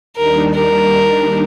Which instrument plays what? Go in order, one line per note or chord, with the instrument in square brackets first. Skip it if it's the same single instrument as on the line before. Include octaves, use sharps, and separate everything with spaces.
[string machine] D#2 D#3 G3 D4 [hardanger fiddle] A#4
[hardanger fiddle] A#4